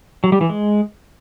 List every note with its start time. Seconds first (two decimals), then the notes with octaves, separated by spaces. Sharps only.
0.24 F#3
0.32 G3
0.41 E3
0.49 G#3